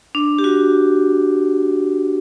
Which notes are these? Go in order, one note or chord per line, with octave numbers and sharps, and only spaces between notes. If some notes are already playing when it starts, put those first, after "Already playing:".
D4
G4
F#4